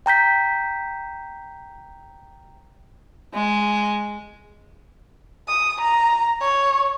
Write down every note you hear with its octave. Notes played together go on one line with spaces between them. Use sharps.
G5 A#5 G6 B6
G#3
D#6
A#5
C#5